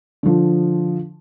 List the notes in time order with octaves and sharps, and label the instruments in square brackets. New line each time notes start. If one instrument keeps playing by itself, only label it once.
[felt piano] D3 F3